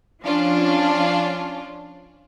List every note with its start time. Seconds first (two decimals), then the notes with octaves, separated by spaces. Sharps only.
0.22 F3 C#4 D4 F4